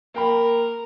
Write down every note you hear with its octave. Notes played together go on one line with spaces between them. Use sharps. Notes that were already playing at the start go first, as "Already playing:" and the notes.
A#3 A#4 G5 B5